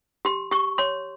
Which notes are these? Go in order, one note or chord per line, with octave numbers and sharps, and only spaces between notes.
G4 C6
G4 C#6
C#5 C6